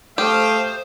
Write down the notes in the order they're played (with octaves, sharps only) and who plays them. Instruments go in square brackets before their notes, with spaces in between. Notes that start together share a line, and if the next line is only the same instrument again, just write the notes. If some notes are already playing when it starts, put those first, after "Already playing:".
[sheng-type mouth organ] A3 D#6 [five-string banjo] G4 [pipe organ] C5 [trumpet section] F5 G5